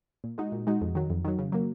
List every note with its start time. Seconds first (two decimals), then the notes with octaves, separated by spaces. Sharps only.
0.24 A#2
0.38 G#3 D#4 F#4
0.52 A#2
0.67 G#3 D#4 F#4
0.82 F2
0.95 D#3 F#3
1.10 F2
1.25 D#3 F#3
1.39 C#3
1.52 F#3 A#3